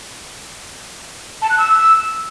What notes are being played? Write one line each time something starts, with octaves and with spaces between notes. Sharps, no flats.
A5
F#6
E6